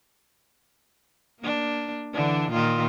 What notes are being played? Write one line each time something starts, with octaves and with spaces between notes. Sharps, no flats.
A#3 D4
D3 E3 D4
A#2 D#3 F4